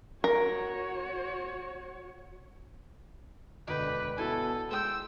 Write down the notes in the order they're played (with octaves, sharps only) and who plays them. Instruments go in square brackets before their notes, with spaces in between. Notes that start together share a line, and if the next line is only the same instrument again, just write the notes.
[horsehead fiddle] F#4 C#5 [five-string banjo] A#4
[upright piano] E1 D2 D#5 [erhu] B4 [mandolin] D5 G5
[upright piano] B2 E4 [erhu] A4 [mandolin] G#5
[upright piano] G#3 [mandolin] C5 G5 [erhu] E6